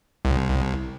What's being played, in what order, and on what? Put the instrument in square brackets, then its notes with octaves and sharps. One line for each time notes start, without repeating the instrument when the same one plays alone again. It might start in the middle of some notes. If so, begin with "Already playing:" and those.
[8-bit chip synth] C2